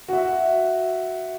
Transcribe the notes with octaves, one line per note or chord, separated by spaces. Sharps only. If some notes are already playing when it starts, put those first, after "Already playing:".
F#4 E5